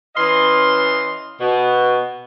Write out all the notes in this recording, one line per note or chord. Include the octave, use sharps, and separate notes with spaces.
E3 C#4 D#5 F5 C6
B2